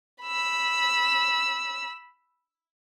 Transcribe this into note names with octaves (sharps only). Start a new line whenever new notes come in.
B5 E6